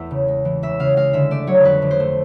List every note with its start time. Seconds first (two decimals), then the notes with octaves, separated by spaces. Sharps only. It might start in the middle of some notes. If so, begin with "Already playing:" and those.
Already playing: E2 A3 E5
0.11 C#3
0.28 G#3
0.45 E3
0.63 C#2 E5
0.79 C#3 F5
0.96 G#3 F5
1.13 D3 E5
1.31 A3 D5
1.47 F#3 C#5
1.64 F2 B4
1.82 D3
1.91 C5
2.00 A3